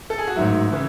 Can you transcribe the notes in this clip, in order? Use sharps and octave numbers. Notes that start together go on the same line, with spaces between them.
A4
G#4
F#4
A1 G#2 D#3 F#3 E4
C#3 E3